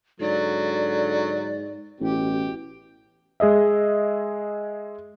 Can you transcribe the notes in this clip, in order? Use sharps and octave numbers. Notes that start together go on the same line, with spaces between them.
G#2 D3 F#3 D5
A1 B2 G4
G#3 G#4 D#5 E5